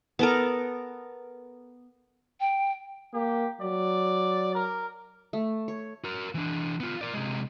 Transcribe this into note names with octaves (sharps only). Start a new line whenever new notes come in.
B3 A4 A#4
G5
A#3 G4
F#3 D5
A#4
A3
C#5
F#4 A#4
E3 D4
B3 F4
A#4 D5
C3 G#3